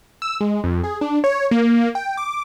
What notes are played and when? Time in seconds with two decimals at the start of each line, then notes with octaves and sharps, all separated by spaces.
0.22 E6
0.41 G#3
0.64 F2
0.84 G#4
1.01 D4
1.24 C#5
1.51 A#3
1.95 G5
2.17 D6